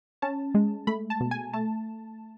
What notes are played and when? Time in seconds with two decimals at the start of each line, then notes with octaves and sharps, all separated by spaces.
0.22 C#4 A5
0.54 G#3
0.87 A3 B5
1.10 A5
1.20 B2
1.31 G#5
1.53 A3 A5